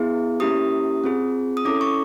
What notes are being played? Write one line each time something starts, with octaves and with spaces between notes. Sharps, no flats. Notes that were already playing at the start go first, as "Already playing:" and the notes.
Already playing: B3 E4 G#4
A#3 C#4 E4 G4 D#6
C4 F4 G#4
D#6
C#4 E4 A4 D6
C#6